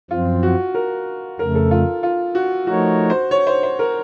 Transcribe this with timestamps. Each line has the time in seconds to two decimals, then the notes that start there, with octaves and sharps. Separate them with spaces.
0.11 F#2 F3 C4 F4
0.43 F#4
0.75 A#4
1.39 F2 C#3 A3 A#4
1.55 A4
1.71 F4
2.03 F4
2.35 F#4
2.67 F3 A3 D#4 F#4 A#4 C#5
3.10 C5
3.31 C#5
3.47 C5
3.63 C5
3.79 A#4